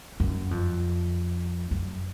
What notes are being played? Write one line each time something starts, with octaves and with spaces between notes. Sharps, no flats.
F#2
F2
F#2